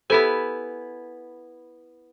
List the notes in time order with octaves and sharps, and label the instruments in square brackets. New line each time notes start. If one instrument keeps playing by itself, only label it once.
[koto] B3 E4 G#5 [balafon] G4 A4 C5